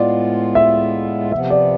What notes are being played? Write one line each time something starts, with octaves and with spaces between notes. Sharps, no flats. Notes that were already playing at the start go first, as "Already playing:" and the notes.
Already playing: A2 G#3 B3 F4 D5
E5
C3 F3 B3 E5
D5